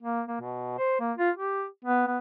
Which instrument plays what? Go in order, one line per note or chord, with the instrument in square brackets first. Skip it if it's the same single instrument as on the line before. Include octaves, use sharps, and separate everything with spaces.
[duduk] A#3
A#3
B2
C5
A#3
F4
G4
B3
B3